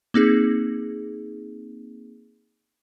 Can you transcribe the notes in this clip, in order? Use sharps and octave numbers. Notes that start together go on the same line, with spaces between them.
A#3 C4 D#4 G#4